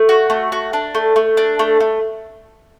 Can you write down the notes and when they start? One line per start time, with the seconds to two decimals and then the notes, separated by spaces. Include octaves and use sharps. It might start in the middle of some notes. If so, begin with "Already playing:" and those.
Already playing: A3
0.09 F#4
0.30 A3
0.52 F#4
0.73 D4
0.95 A3
1.16 A3
1.37 D4
1.59 A3
1.80 A3